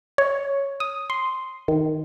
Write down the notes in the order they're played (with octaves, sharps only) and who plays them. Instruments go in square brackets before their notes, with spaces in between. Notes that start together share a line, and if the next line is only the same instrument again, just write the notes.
[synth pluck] C#5
D#6
C6
D#3